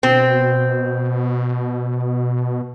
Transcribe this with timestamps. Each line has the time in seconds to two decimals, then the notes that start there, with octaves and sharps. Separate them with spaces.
0.03 B2 C4